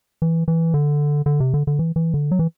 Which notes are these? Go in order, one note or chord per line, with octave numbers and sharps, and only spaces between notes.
E3
E3
D3
D3
C3
D3
D3
E3
E3
D3
F#3
E3